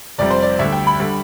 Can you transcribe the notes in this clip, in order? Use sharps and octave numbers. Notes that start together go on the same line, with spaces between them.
F1 F2 C3 G3 D5
C5
D5
D2 D3 G3 E5
G5
B5
D3 G3